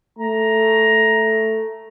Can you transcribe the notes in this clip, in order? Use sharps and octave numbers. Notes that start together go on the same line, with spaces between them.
A3 A#5